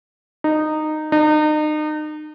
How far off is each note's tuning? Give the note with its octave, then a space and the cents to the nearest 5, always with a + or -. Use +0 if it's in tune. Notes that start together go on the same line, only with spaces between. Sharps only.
D#4 -15
D#4 -35